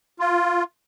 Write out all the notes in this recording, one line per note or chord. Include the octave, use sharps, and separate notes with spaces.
F4